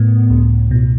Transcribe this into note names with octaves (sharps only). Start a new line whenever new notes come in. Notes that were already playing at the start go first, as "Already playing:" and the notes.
Already playing: A2 B3
C#2
B2